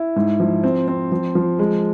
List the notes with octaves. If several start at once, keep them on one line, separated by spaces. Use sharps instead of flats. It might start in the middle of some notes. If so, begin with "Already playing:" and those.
Already playing: E4
G#2
F3
C4
C4
F3
F3
G#3